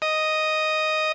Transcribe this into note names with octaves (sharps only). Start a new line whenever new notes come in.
D#5